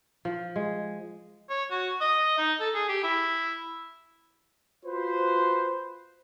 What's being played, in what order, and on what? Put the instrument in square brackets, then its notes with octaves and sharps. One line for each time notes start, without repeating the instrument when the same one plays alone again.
[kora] F3
G#3
[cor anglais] C#5
F#4
D#5
D#4
A4
G#4
G4
E4
[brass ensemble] F4 F#4 B4 C5